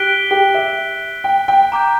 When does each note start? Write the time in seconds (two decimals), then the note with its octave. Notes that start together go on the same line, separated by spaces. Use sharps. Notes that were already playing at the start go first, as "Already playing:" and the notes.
Already playing: G4 F#6 B6 D7 G7
0.31 G4
0.54 E5
1.24 G5
1.48 G5
1.72 A#5 D6 G6